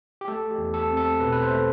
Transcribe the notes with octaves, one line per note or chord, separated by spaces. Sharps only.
G4
A3 A4
G4
E2
A4
C4
A4
B2 B4
B4
C5
A3